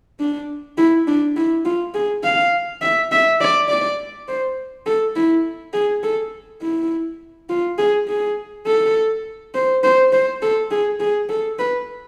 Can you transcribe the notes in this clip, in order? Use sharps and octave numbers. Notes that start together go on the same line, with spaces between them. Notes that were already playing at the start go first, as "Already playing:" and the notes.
D4
E4
D4
E4
F4
G#4
F5
E5
E5
D5
D5
C5
A4
E4
G#4
A4
E4
F4
G#4
G#4
A4
C5
C5
C5
A4
G#4
G#4
A4
B4